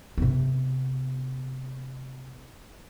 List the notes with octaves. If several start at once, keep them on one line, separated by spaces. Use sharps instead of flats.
C3 B3